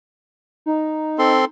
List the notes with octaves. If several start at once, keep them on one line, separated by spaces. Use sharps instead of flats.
D#4
C4 A4 C6